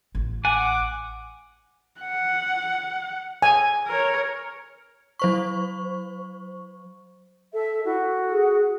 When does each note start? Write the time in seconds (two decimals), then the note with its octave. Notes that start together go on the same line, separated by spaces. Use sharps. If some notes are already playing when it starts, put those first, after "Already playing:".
0.15 A1
0.45 F#5 G#5 D6
2.01 F#5
3.42 G#5
3.87 A#4 C#5
5.19 F#3 C5 C#6
7.53 A4 E5
7.85 E4 F#4
8.02 A4
8.32 G#4